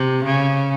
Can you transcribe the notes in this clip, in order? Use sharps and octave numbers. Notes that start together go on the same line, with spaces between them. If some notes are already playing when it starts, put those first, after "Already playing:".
Already playing: C3
C#3